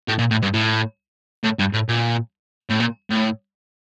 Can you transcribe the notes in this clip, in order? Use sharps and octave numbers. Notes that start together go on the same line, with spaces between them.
A2
A#2
A2
G2
A2
A2
G2
A2
A#2
A2
A#2
A2